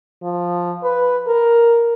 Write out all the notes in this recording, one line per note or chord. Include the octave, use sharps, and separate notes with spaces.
F3
B4
A#4